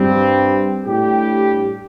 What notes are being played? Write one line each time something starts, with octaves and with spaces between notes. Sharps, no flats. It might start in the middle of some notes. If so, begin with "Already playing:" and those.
Already playing: G2 G3 C4
A2 G3 D4 G4